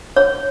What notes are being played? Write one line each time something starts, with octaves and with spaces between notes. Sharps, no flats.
C#5